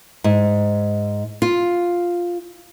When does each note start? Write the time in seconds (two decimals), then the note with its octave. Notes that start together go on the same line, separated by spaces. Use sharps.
0.24 G#2
1.42 F4